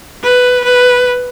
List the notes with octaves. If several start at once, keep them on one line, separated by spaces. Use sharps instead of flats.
B4
B4